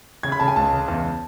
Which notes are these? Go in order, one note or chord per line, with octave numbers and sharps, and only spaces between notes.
C#3 G#6
B5
C#3 A5
G#5
C#2 A5
C#3
E2